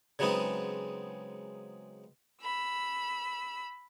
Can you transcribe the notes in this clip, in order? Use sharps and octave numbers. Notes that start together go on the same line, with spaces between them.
C#3 F#3 G#3 B3 C4 D#4
B5 E6